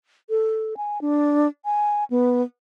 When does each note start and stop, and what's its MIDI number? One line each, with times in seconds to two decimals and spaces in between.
0.30 0.77 69
0.77 1.01 80
1.01 1.48 62
1.65 2.04 80
2.10 2.42 59